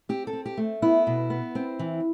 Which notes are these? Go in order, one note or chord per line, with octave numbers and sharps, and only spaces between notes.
C4 G4
A4
C4
G4
A3
B3 E4
B2
B3
C4
E3